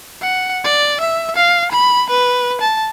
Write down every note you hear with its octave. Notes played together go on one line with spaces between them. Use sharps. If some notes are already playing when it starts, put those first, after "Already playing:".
F#5
D5
E5
F5
B5
B4
A5